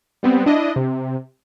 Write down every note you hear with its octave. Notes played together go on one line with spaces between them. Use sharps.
G3 B3 C4
D4 E4 D#5
C3